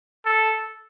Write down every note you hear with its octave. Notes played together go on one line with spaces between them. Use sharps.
A4